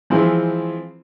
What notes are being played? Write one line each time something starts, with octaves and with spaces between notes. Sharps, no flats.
E3 F3 G#3 C4 E4